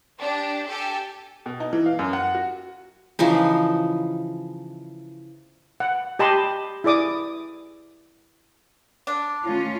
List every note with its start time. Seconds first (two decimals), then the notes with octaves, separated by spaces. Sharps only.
0.19 D4 G4
0.67 G4 A4 G#5
1.46 B2
1.60 D#4
1.73 E3
1.86 F5
1.99 F#2
2.13 F#5
2.35 F#4
3.19 C#3 E3 F3 D#4
5.80 F#5
6.19 G4 D#5 A5 B5 C6
6.84 E4 G#4 D5 D6 D#6
9.07 D4
9.45 D#3 A3 C#4 F4